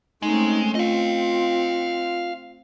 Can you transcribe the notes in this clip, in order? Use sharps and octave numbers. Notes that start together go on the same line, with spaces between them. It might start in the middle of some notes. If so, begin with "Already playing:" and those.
G#3 A3 C4 C#4 D#4
C4 F4 D#5 F5